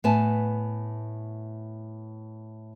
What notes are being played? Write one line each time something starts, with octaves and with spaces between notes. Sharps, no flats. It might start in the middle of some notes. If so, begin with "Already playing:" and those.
A2 B3 E5 G#5 A5